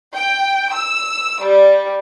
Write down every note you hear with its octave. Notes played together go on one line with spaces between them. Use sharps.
G5
E6
G3